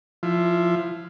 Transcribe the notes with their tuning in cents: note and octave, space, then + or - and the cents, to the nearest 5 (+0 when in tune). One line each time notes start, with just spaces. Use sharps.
F3 +0 E4 +20